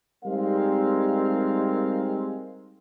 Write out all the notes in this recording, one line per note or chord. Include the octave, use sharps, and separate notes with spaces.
G3 G#3 C4 D#4 A#4 F5